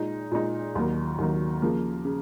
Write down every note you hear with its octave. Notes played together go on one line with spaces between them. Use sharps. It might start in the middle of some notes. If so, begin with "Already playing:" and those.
Already playing: A#2 G#3 D#4
A#2 G#3 D#4
D#2 D#3 F#3 A#3
D#2 D#3 F#3 A#3
C#3 F3 A#3
C#3